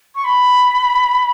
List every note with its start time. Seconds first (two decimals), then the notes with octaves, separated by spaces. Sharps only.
0.15 C#6
0.24 B5